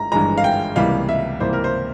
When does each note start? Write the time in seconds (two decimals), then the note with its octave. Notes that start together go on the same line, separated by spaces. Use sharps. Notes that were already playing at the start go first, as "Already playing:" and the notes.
Already playing: G1 G2 G#3 A#5
0.12 G1 G2 E3 G#3 A#5
0.38 F5
0.44 G5
0.76 C#2 C3 E3 G3 A#3 F5
1.09 E5
1.40 C#2 C3 E3 G3 A#3 C5
1.53 A#4
1.64 C5